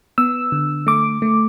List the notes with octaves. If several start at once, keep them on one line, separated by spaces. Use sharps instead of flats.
B3 E6
D3
A3 D6
A3